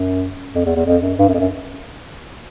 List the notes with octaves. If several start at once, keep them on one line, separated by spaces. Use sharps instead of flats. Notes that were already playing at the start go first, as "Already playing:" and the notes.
Already playing: F#2
F2
E2
E2
F2
F#2
G2
F#2
F2
F#2